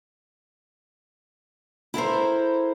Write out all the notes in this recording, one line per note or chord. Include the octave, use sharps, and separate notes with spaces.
E4 A4 A#4 C5